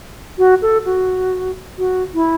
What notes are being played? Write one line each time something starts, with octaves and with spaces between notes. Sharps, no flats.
F#4
A4
F#4
F#4
E4